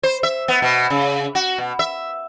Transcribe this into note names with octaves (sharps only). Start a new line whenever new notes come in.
C5
E5
B3
B2
C#3
F#4
B2
E5